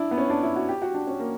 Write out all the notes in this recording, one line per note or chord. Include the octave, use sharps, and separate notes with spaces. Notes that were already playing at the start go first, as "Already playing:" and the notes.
Already playing: D4 E4
B3
C#4
D4
E4
F#4
G4
F#4
D4
C#4
A#3